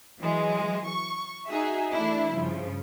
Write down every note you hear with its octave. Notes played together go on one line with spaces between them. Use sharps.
E3 F#3 G#3
C#6
D#4 F#4 G#4 E5
E3 A3 D4 E4
G2 C#3 F3